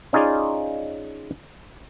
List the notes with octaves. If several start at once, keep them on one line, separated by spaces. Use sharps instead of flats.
C#4 D#4 F4 G#4 D5